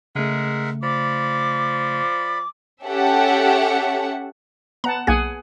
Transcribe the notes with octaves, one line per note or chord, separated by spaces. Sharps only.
C#3 G#3 A3 A#4 E5 F#5
F3 D5 B5 D6
C#4 G4 A4 E5 F#5
B3 F#5 A5 A#5
B1 A#3 G#4 F#5 G#5 G#6